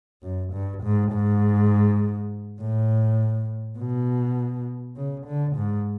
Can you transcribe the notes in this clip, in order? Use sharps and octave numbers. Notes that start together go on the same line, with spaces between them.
F#2
G2
G#2
G#2
A2
B2
C#3
D3
G#2